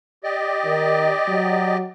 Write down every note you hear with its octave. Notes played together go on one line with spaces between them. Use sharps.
G4 D5 D#5
D#3
F#3